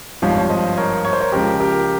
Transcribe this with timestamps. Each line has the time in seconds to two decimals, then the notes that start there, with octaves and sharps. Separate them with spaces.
0.22 G#1 G2 F3 C#5 F5
0.38 C#5
0.50 C5 D#5
0.77 A#4 C#5
1.05 C#5
1.13 C5
1.21 A#4 C#5
1.32 C#2 C#3 F3 G4 A#4
1.60 G4 A#4